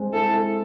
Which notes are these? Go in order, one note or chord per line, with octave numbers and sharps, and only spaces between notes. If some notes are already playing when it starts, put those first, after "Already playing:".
Already playing: G#3 C4
E4 A4
E4